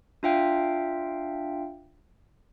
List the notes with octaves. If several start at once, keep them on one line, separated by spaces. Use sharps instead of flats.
D4 F4 E5 F5 G5